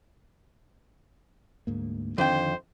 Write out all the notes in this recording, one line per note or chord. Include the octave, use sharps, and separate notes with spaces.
D2 G#2 A#3
F2 D3 D#3 D4 C5 G5